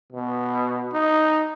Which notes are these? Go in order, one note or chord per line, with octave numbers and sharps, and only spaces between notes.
B2
D#4